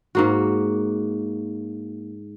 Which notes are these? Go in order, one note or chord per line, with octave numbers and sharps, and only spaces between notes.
G#2 A#3 F#4